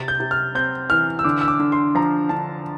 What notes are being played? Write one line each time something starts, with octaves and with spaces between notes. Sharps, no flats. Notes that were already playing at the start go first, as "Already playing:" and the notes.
Already playing: C3 A6
G6
C3
F6
C4 G6
E3 F6
E6
D3 D6
E6
D6
D3
C6
F3 A#5
D3 A5